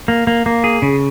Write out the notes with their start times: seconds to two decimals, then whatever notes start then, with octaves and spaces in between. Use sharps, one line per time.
0.08 A#3
0.27 A#3
0.46 A#3
0.64 G#4
0.82 C#3